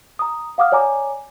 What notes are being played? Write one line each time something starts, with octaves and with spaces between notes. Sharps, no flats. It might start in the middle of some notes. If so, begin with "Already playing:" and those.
A#5 D#6
F5 F#5 D6 D#6 F6
C#5 D5 G#5 A#5 D6